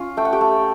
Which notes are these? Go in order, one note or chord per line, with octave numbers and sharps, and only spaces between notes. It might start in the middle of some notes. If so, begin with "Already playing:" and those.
Already playing: C#4 F4
A3 G5
F#5
G4 G5
A3